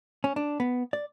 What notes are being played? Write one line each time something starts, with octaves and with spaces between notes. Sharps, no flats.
C#4
D4
B3
D5